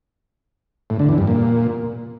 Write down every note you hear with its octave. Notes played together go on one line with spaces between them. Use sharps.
A2
D3
E2
G2
A#2